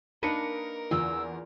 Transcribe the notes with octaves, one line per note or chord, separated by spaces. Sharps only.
A#3 D4 D#4 A#4 B4 C#7
E2 F4 E6